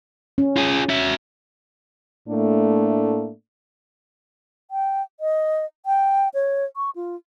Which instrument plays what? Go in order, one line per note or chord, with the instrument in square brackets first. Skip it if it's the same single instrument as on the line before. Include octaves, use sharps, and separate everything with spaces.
[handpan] C#4
[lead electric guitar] F4 G#4
F#4 E5
[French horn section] A2 A3 A#3 D4
[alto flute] G5
D#5
G5
C#5
C#6
F4